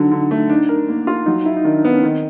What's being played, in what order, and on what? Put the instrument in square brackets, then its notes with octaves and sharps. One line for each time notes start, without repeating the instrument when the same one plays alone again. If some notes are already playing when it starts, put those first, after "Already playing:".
Already playing: [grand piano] D3 F#3 [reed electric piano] D4 D#4
[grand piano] D3 [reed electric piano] D#4
[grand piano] A3
[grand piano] D4 [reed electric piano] D#4
[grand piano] A#4
A#3
F4
[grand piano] F#3 [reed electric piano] D#4
[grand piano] E4
[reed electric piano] D#4
[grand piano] D#3 [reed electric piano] D4
[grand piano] B3
[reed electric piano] C#4
[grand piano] D#3 [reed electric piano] C4